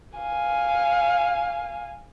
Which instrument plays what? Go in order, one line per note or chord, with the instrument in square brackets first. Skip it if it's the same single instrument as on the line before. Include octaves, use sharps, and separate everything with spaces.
[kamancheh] F5 G#5